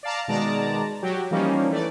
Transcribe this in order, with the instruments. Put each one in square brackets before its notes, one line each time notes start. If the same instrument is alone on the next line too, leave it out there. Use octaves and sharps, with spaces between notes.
[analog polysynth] D5 F5 A5 A#5
B2 D#3 G#3 D5 A5 A#5
F#3 F#4 G4
E3 F3 G3 A#3 C#4 D#4
E3 A3 D5